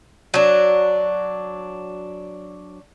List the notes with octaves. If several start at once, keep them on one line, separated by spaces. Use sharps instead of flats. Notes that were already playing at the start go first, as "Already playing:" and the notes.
F#3 D4